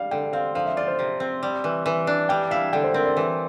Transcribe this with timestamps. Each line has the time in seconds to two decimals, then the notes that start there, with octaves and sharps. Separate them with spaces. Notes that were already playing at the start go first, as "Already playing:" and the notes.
Already playing: G3 F5
0.11 D3 G5
0.33 C4 F5
0.55 F3 F5
0.66 E5
0.77 F4 D5
0.88 C5
0.99 C3
1.20 C4
1.43 G3
1.64 E3
1.86 E3
2.07 D4
2.29 G3 G5
2.51 E4 F5
2.73 D3 G5
2.84 C5
2.94 C4 A#4
3.06 D5
3.17 E3